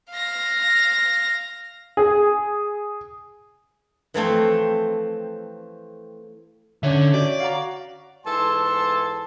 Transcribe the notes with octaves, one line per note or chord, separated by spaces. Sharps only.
F5 A#6
G#4
E3 F3 A3 C4
D3 C#4 C#5 E5
F#4 C#5 D5
F5 F#5 A#5
G#2 E3 A4 A5 C6